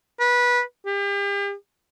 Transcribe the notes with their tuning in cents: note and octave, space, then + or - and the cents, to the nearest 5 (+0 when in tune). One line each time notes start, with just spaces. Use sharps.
B4 -20
G4 +40